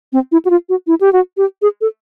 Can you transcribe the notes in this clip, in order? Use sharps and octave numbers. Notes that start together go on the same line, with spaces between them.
C4
E4
F#4
F4
F#4
E4
G4
F#4
G4
G#4
A4